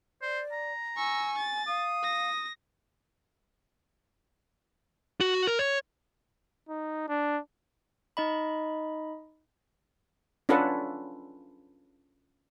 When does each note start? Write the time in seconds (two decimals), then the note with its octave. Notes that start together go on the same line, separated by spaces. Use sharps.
0.22 C5 D5
0.52 A#5
0.97 G#5 C#6 E6
1.38 A6
1.67 F5 D#6
2.03 A#6
5.21 F#4
5.47 A#4
5.59 C#5
6.69 D#4
7.08 D4
8.17 D#4 D#5 B5
10.49 C#4 D4 F4 A4 B4 F#5